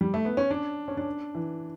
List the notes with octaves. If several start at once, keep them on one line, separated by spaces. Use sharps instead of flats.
G3
A3
B3
C#4
D4
C#4
D4
E3